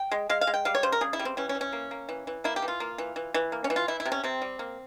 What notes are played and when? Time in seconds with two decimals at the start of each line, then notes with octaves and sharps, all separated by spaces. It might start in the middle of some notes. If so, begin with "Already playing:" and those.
Already playing: G5
0.12 G#3
0.29 G#3 F5
0.41 F5
0.47 G#3
0.54 G5
0.65 G3 F5
0.75 C#5
0.83 C#3 C5
0.92 A#4
1.01 C#3 G#4
1.13 E4
1.19 G3
1.25 C4
1.37 E3 C#4
1.49 C#4
1.55 E3
1.61 C#4
1.73 A#3
1.91 A#3
2.09 E3
2.27 E3
2.44 A#3 E4
2.56 G4
2.62 E3
2.68 F4
2.80 A#3
2.98 E3
3.16 E3
3.34 E3
3.52 A#3
3.64 C#4
3.70 E3
3.76 F4
3.88 E3 E4
4.00 E4
4.05 C3
4.12 C#4
4.24 C3 C4
4.42 G3
4.59 A#3